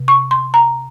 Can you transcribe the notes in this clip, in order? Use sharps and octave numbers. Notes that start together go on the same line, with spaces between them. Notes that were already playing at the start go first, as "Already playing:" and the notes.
Already playing: C3
C#6
C6
A#5